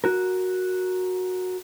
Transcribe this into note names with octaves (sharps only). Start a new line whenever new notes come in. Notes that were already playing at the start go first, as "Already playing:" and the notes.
F#4 A#4